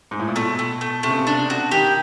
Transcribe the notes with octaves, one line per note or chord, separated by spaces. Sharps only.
G#2
A2
A#2
B2 A3
A3
A3
C3 A3
C#3
C3
D4
F#4
D#3 G4